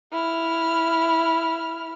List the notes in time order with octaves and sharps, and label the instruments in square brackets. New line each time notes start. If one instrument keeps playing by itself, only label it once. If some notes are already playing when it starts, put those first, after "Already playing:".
[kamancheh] E4 F6